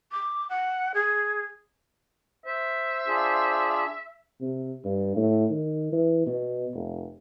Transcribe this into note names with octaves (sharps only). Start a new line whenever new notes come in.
D6
F#5
G#4
C5 E5
D4 F4 G#4
C3
G2
A2
D#3
E3
B2
F1